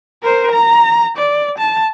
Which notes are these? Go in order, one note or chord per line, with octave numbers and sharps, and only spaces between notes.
A#4 C5
A#5
D5
A5